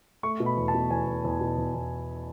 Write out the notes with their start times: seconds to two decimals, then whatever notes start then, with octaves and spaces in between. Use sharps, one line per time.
0.23 A3 C#6
0.40 B2
0.46 B5
0.57 E2
0.68 A5
0.74 B2
0.90 E2 G#5
1.07 E2
1.25 E2
1.41 B2
1.58 E2
1.75 E2